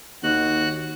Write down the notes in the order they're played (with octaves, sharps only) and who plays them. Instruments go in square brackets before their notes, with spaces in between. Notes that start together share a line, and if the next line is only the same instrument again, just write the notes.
[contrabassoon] D#2 [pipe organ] F#4 F#6